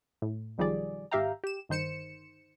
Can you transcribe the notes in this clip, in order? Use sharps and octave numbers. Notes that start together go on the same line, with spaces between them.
A2
B1 D#3 F3 G3 G#4 D5
G#1 G4 E5 F5 G5 A#5
G4 E7
G1 D#3 C5 C#7 E7